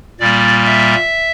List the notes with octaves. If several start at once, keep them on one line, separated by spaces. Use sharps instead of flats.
A#2 G3 A#3 D5
E5